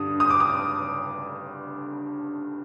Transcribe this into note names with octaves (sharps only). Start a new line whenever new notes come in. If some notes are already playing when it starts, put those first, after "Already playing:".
Already playing: G2 D3 D#6
D#6
D6
D#6